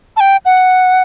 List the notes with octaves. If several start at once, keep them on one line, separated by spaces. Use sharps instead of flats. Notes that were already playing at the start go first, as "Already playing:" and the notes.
A5
G5
F#5